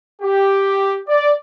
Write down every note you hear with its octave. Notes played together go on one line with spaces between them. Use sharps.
G4
D5